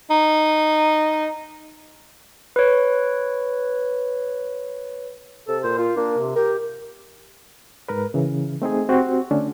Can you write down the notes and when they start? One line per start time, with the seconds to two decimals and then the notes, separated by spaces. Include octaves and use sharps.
0.10 D#4
2.56 B4 C#5
5.48 C3 A4
5.64 A#2 C5
5.78 F4
5.97 A#3 D4
6.17 C3
6.36 G4 A#4
7.89 G#2 A#4 B4
8.14 C#3 E3
8.62 A3 C4 D#4 G#4
8.89 C4 F#4 G4
9.31 D3 A3 C#4 D4